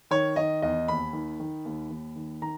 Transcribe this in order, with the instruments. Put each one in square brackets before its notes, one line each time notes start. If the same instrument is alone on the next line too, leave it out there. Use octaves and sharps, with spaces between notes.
[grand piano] D#3 C#5
D#3 D#5
E2 D#5
D#2 B5
D#3
D#3
D#2
D#2
D#3
D#3 A#5